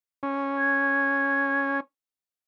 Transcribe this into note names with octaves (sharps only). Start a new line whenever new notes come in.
C#4
G#6